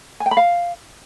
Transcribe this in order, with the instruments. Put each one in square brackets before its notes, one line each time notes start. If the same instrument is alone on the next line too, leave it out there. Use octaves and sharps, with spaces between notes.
[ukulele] G#5
G5
B5
F5